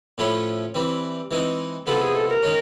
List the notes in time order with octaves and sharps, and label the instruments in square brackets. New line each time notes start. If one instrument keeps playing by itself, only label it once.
[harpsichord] A2 F3 A3 C#4 E4
E3 G3 C4
E3 G#3 C4 D#4
[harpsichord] C3 F3 G#3 B3 E4 [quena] A4
[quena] G#4
A4
A#4
[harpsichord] D#3 G#3 C#4